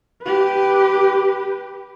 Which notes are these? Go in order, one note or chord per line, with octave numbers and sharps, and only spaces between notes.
G4 B4